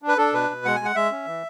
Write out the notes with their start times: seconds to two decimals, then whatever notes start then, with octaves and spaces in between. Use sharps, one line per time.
0.02 D4
0.08 B4
0.17 D4 A4
0.33 B2 B4
0.50 B2
0.65 G#3 F#5
0.76 G#3 G#5
0.85 F#5
0.95 G#3 E5
1.11 C#4
1.27 E3